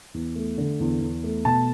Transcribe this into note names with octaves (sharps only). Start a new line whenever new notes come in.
E2
A3
D3
E2
E2
A3
B2 A5